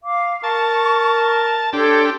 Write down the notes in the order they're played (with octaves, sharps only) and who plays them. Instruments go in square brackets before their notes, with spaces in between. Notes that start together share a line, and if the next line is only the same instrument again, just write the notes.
[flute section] F5 D6
[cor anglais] A#4 [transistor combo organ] A5 [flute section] C#6
[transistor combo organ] D4 G4 [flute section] A4 C#5 C6